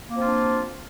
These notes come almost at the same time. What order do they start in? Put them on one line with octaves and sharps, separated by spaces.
A#3 C4 F3 F4 D4